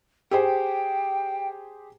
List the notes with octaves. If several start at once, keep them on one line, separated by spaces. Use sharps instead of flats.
G4 G#4 C5 G5